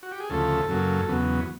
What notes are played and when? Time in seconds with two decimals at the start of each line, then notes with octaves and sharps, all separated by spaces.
0.03 F#4
0.12 G4
0.20 G#4
0.30 D2 C#3 F3 A3 A4
0.69 F#2 C#3 F#3 A#3
1.08 E2 C#3 F#3 B3